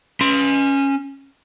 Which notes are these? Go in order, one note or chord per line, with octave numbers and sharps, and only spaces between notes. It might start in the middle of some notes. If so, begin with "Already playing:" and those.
C#4 C6